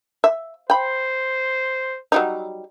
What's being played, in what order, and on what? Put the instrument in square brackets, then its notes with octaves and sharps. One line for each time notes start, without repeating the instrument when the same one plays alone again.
[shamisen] E5
[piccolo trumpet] C5 [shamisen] G5 B5
[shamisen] F#3 G3 D#4